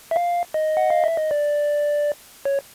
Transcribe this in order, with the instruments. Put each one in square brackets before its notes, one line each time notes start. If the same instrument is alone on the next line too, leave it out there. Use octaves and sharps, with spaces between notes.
[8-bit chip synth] E5
F5
D#5
F#5
F5
E5
D#5
D5
C#5